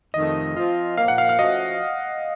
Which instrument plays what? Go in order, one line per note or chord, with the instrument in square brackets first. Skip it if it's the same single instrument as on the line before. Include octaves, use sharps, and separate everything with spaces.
[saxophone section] F2 C3 D#3 A3 [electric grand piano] D#5
[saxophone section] F3 C4 F4
[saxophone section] A#2 F3 A#3 [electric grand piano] F5
[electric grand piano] F#5
F5
F5
[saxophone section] F3 A3 C#4 F#4 [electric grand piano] D#5